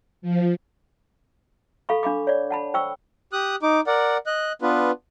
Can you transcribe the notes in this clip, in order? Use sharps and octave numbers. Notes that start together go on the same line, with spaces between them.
F3
A4 F5 B5 C#6
D4 F5 B5 D6
C#5 D5
F#5 A5 B5
C5 G5 C#6 E6
G4 D#6 F#6
D#4 D6
A#4 D5 F#5
D#5 F#6
B3 D4 F4 B4